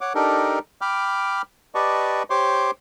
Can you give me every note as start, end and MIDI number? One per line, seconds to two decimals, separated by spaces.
0.01 0.13 73
0.01 0.13 78
0.01 0.13 86
0.15 0.59 62
0.15 0.59 63
0.15 0.59 67
0.15 0.59 69
0.15 0.59 70
0.81 1.42 79
0.81 1.42 83
0.81 1.42 86
0.81 1.42 89
1.75 2.23 67
1.75 2.23 71
1.75 2.23 74
1.75 2.23 75
1.75 2.23 81
1.75 2.23 85
2.30 2.71 67
2.30 2.71 72
2.30 2.71 73
2.30 2.71 84
2.30 2.71 86